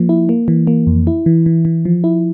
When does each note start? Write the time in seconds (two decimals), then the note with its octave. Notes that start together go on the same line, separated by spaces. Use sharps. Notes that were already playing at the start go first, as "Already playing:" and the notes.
Already playing: F3 A#3
0.09 E4
0.29 A#3
0.48 E3
0.67 A#3
0.87 F2
1.07 E4
1.26 E3
1.46 E3
1.65 E3
1.85 F3
2.04 E4